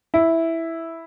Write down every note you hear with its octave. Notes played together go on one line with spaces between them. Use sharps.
E4